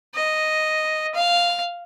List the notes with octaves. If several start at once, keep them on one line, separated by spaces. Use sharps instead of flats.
D#5
F5